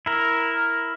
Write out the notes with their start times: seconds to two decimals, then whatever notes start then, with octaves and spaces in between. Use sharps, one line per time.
0.06 E4 A#4